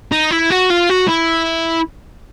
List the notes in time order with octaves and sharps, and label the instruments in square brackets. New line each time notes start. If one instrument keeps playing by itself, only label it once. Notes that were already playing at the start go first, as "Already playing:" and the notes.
[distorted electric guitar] D#4
E4
F#4
F4
F#4
E4